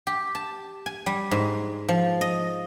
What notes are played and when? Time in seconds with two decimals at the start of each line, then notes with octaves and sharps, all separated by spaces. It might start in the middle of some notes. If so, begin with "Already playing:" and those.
0.07 G4
0.35 A5
0.86 G#5
1.06 G3
1.31 G#2
1.89 F3
2.21 D#5